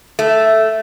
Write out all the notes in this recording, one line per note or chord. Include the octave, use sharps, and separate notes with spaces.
A3